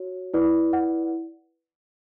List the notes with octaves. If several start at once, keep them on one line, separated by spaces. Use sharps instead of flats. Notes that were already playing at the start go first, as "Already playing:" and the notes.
Already playing: F#4 C#5
E4 B4 D5
F#5